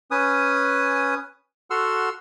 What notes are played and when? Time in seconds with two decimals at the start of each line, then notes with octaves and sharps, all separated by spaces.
0.11 C#4 B4 G#5 D#6
1.71 F#4 A4 F#5 C6 E6 F6